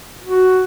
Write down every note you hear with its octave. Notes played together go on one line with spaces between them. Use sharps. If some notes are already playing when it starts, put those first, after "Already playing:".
F#4